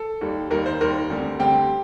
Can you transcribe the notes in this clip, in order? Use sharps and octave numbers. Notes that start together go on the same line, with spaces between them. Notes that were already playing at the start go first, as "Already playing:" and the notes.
Already playing: A4
D#2 D#3 G3
D#2 D#3 G3 A#4
C5
D#2 D#3 G3 A#4
D2 D3 G3 C4
D2 D3 G3 C4 G4